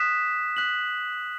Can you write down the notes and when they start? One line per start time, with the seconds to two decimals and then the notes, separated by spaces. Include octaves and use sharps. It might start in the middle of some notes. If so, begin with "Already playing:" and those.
Already playing: D#6 F#6 B6 E7
0.57 F#6 B6 F#7